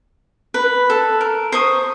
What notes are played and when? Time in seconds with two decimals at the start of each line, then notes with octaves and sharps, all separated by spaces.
0.54 B4
0.90 A4
1.21 A#4
1.52 C5 C#6 D#6